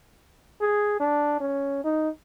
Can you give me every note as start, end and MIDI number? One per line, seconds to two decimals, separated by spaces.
0.61 0.97 68
1.00 1.38 62
1.40 1.81 61
1.84 2.09 63